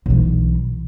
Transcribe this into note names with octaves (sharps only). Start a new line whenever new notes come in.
B1 E3